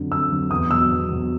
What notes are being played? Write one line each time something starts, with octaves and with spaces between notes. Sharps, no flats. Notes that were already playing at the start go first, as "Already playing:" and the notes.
Already playing: F2 D3 F#3
F2 E6
D3 F#3
E2 D#6
B2 F#3 E6
E2
B2 F#3